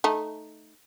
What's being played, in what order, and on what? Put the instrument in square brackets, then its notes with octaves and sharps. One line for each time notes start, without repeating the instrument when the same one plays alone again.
[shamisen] A3 D#4